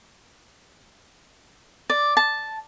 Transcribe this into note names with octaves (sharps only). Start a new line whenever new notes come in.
D5
A5